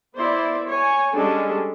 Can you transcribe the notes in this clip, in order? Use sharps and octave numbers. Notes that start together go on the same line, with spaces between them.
B3 E4 C5 D5
C#5 G#5
G3 G#3 C#4 D4 G#4 A4